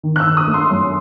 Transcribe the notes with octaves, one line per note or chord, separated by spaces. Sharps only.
D#3
F#6
E6
D#3
D#6
A3
C6
F#2